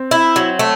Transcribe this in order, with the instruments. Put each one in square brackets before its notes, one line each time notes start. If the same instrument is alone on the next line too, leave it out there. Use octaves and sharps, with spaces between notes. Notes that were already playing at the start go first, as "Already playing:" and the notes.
Already playing: [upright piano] C4
[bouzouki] E4
F#3
A3